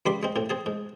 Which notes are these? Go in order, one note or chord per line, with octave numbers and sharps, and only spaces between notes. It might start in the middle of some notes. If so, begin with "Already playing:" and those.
C#2 G3 B5 C6 D6
G#3 C4
A2 C4
C4 G#4 A5
G#2